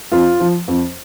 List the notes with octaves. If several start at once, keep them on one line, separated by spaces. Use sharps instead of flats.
F2 F4
F3
F2